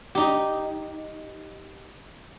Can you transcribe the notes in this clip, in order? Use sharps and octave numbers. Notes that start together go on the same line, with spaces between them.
D#4 G4